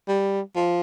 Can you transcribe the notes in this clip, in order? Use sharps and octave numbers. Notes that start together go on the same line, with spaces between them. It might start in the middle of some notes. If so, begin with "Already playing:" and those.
G3
F3